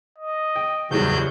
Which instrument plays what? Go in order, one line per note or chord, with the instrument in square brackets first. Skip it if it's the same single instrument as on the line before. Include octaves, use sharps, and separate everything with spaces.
[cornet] D#5
[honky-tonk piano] G5
[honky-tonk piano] F#1 A2 G3 [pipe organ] E2 F#3 G6